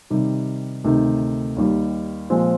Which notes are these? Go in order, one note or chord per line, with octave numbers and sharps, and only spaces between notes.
C3 D#3 G3
D2 C3 D#3
D#2 D#3 G3
A#2 F3 G#3 C4